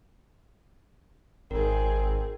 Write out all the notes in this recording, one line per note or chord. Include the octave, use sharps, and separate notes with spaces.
G#1 C4 G#4 A#4